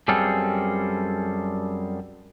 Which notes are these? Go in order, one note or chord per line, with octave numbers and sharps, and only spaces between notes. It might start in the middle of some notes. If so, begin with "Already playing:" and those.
F#2 G3 C4 G#4 A4 F5